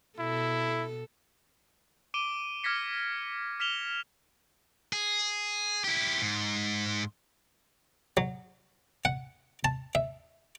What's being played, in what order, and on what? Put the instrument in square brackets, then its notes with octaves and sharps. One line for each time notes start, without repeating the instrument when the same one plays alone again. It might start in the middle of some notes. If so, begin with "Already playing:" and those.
[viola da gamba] B2 A4 [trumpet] E4
[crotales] D6 D7 D#7 G7
D6 F6 G#6 A#6 B6 C#7
F6 B6 E7 F7 G7
[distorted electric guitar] G#4
E4 G4
G#2
[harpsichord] F#3
F#5
A5
E5